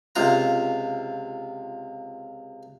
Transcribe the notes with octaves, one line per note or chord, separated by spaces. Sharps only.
C#2 C3 F4 A#5